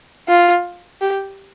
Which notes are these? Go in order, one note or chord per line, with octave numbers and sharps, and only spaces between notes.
F4
G4